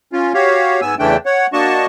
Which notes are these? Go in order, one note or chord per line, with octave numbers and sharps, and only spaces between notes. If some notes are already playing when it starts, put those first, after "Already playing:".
C#4 F4
F#4 G4 C#5 F5
G#2 B3 G#5 E6
E2 C#3 E3 A3 D4 G5
C#5 F#5
A#3 D4 F#4 D#5 A5 C#6